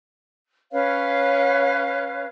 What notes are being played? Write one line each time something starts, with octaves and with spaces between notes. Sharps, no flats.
C#4 B4 C#5 F5